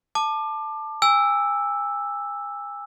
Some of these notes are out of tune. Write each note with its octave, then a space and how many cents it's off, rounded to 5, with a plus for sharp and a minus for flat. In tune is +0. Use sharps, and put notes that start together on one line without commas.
A5 +0 D6 +25
G#5 -35 E6 +0